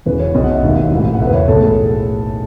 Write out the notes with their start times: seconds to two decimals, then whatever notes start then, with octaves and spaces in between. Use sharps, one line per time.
0.06 E1 E2 C#3 E3 B4
0.20 C#5
0.34 B1 B2 D#5
0.44 F#5
0.53 E5
0.62 E1 D#2 D#3
0.92 A1 G#2 E3
1.13 F#5
1.19 F#1 E2 B2 E5
1.27 B4
1.34 C#5
1.48 B1 A2 E3 A4
1.62 G#4